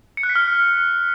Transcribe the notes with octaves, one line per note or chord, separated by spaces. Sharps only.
C#7
F#6
B6
F6
F#6